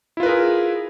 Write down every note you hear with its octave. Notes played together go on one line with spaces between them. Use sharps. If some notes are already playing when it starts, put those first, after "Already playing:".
E4 F4 G#4 A#4 B4